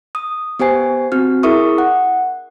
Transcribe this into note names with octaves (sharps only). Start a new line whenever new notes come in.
D#6
B3 G4 C5 G#5 C7
C4 F#4 F6
E4 G#4 A#4 E5 C#6 D#6
F#5